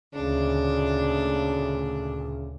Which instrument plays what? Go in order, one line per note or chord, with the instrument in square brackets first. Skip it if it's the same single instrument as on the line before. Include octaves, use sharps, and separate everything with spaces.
[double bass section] D2 A#2 [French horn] C#3 [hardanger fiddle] D4